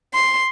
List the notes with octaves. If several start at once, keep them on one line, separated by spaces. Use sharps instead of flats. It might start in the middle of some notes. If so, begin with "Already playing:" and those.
C6